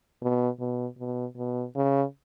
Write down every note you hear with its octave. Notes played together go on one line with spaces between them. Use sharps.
B2
B2
B2
B2
C#3